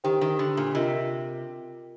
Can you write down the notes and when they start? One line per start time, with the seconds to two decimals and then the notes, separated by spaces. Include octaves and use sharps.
0.04 D#3 G4 C5 G5
0.21 D#3
0.39 D3
0.57 A#2
0.75 C3 F4 A#4 D#5